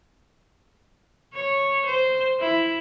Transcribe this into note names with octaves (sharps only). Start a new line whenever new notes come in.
C#5
C5
E4